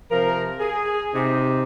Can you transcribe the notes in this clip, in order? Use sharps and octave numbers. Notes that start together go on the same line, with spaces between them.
C3 F3 A#4
G#4
C3 D#4